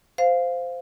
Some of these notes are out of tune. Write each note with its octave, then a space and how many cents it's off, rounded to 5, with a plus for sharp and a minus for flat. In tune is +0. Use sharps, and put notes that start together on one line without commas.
C5 -10 F5 +0